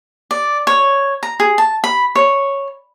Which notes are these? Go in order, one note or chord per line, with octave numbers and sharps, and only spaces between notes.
D5
C#5
A#5
G#4
A5
B5
C#5